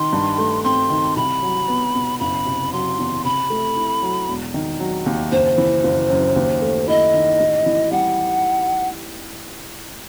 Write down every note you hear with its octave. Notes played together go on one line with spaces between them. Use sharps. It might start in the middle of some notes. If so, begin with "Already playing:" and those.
Already playing: D#3 C6
G2
A3
C4 C6
D#3
C2 B5
F#3
B3
B2
F#1 B5
C3
F#3 C6
E2
C3 B5
A3
E4
F#3
E1
D#3
F#3
D#2
F#1 C5
E3
F#1
F#2
D#2
A3
E4 D#5
D#3
A1
E3
G3 F#5